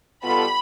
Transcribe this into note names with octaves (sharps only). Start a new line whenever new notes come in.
B2 G3 B3 F4 A4 B5